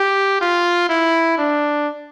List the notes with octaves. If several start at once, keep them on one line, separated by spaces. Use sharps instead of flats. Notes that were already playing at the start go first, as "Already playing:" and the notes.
Already playing: G4
F4
E4
D4